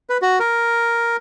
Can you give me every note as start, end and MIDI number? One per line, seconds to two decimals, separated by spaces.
0.09 0.17 71
0.22 0.39 66
0.40 1.16 70